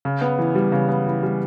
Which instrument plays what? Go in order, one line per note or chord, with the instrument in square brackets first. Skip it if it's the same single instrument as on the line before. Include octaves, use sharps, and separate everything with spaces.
[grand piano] C#3
B3
E3
G3
C#3
B3
E3
G3